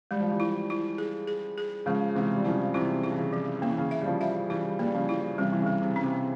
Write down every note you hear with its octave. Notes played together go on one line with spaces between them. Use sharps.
G3 G#3
F3
E3 G3
E4
E4
G#4
G#4
G#4
C#3 F3 G#3
C3 E3 G#3
G3
C#3 F3 E4
C3 E3 E4
E4
E3
C#3
F3
C#3 A#3
E3
C#3
E5
G3
C#3 F3
E5
E3 G3 E4
G3 A#3
C#3 F3
E4
C3 E3 G3
E3
C#3
G3
C3
C#4
C3